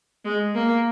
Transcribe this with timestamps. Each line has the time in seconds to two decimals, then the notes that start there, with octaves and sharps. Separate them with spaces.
0.25 G#3
0.54 A#3